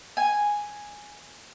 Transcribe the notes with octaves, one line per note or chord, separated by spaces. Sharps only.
G#5